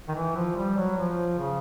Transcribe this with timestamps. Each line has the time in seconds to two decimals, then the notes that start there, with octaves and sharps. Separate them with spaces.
0.09 D#3
0.15 E3
0.36 F3
0.56 G3
0.77 F#3
0.97 F3
1.38 C#3